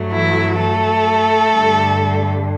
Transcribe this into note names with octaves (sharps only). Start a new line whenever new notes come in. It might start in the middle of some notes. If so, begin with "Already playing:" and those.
Already playing: G2 F#3 A3
E3 E4
A3 A4
G2 D3 G3